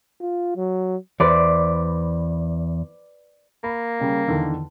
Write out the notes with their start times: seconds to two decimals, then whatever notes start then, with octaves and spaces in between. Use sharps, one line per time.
0.20 F4
0.56 F#3
1.20 E2 B4 C5 D5
3.64 A#3 B5
4.00 C#3 G3 C#4
4.27 E2 D3 D#3